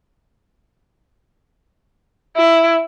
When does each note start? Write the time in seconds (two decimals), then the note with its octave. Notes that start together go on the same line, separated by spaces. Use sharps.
2.36 E4